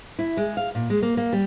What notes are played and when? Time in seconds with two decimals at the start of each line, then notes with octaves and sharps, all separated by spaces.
0.19 E4
0.37 G#3
0.57 F5
0.75 A#2
0.90 G#3
1.02 A#3
1.17 A#3
1.33 G3